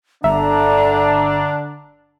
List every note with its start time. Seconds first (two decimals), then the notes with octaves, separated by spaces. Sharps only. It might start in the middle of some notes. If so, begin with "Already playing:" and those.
0.24 G1 D3 D4 E5 A#5